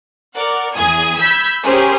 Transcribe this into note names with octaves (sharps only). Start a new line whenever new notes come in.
A#4 D5 F#5
E2 G#4 G#5 D#6 G#6
B5 E6 G6 G#6 B6
C#4 G4 G#4 A#4 C5